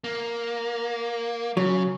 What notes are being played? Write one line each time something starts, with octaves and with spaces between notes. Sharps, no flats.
A#3
C#3 F#3